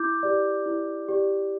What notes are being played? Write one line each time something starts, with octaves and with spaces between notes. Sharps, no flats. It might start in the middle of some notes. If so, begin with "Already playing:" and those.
Already playing: E4 D6 G6
G4 D5
E4
G4 D5